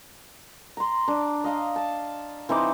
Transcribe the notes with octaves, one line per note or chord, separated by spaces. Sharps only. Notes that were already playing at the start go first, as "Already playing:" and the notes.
A#5 C6
D4 D6
D#5 F5 A#5
A5
E3 C4 D#4 D6